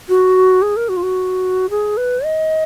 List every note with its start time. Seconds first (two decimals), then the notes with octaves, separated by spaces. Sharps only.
0.09 F#4
0.62 G#4
0.77 A#4
0.89 F#4
0.97 F4
1.03 F#4
1.70 G#4
1.97 B4
2.25 D#5